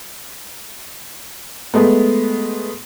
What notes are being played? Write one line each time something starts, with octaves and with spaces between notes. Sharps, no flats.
G#3 A3 B3